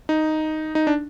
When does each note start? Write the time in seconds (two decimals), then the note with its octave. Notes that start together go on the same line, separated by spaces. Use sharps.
0.09 D#4
0.75 D#4
0.87 D4